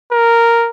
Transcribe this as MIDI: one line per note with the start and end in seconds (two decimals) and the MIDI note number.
0.12 0.70 70